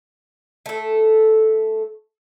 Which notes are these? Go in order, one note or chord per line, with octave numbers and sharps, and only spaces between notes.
A3 A4